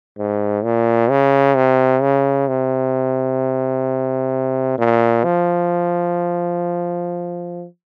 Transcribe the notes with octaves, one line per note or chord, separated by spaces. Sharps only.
G#2
A#2
C#3
C3
C#3
C3
A#2
F3